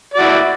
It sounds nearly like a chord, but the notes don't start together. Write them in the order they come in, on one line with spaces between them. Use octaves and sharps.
D5 F#4 E4